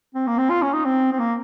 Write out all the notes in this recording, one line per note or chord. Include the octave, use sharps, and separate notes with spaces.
C4
A#3
C4
F4
C#4
D#4
C4
C4
A#3